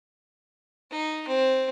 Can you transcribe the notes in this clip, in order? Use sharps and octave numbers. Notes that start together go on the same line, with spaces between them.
D#4
C4